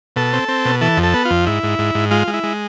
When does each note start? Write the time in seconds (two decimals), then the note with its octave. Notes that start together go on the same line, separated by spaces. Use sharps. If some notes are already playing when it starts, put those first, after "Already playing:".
0.16 B2 A4
0.33 C4
0.48 C4
0.65 B2
0.81 E3 A4
0.97 F2
1.03 A4
1.14 B3
1.25 F4
1.31 F2
1.46 G#2 E4
1.63 G#2
1.79 G#2
1.95 G#2
2.11 G#3 F4
2.28 G#3
2.33 E4
2.43 G#3